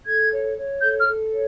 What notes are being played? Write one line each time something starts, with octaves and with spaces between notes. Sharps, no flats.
A4 G#6
C#5
C#5
A4 G6
F6
A4
C#5